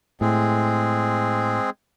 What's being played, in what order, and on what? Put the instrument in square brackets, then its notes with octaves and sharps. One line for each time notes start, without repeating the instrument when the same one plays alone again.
[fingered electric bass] A2 [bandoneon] G#3 C4 G#4